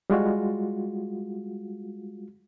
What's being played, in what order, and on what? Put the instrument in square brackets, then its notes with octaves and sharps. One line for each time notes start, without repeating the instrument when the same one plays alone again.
[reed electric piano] G3 G#3 F4 F#4